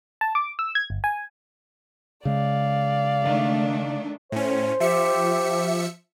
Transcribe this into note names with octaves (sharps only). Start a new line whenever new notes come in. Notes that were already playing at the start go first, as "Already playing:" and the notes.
A5
D6
E6
G#6
G1
G#5
C#3 G#3 D5 F5
D#3 A3 D4
A2 C#4 C5
F3 G4 E5 C#7